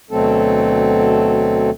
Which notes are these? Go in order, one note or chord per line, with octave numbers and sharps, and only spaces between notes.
D2 B2 F#3 A3 C4 A4